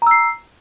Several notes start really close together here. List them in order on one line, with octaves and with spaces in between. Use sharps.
A#5 E6 C7